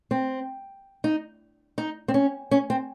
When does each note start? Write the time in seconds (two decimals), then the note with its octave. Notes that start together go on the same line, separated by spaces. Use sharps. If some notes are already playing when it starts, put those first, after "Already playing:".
0.11 C4
1.04 D#4
1.78 D#4
2.08 C4
2.14 C#4
2.51 C#4
2.70 C4